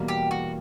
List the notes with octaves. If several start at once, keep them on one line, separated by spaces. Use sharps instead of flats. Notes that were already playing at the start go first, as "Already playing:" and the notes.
Already playing: E2 B2 G3 A#3
G4
F#4